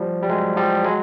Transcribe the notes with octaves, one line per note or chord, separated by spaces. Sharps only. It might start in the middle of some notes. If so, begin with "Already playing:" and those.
Already playing: F3 G3
G3
F#3 G#3
F3 G3
F#3 G#3